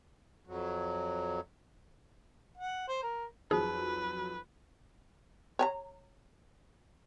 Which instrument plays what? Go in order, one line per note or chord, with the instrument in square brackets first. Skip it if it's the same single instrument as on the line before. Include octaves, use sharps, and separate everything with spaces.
[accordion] F2 F#3
[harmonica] F#5
C5
A#4
[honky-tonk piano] F2 F#3 [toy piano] D#4 C5 [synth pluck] G#4 [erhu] B4
[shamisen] C#5 G#5 A#5